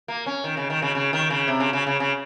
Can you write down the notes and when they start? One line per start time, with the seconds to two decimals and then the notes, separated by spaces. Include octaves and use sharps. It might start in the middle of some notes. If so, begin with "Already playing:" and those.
0.08 A#3
0.26 C#4
0.44 D#3
0.57 C#3
0.70 D#3
0.82 C#3
0.95 C#3
1.13 D#3
1.30 C#3
1.48 C3
1.60 C#3
1.73 C#3
1.87 C#3
2.00 C#3